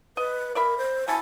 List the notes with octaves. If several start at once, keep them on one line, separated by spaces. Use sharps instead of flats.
B4 D#5
A#4 D5 E5 B5
C5
B2 E4 A4 G#5